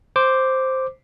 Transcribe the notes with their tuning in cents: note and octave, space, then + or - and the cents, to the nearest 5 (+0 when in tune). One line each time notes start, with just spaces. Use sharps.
C5 +0 D6 +0